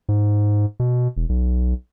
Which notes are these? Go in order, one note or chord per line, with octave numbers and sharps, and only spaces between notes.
G#2
B2
E1
B1